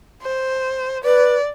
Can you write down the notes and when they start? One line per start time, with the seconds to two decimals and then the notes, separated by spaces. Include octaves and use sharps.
0.22 C5
1.04 B4 D5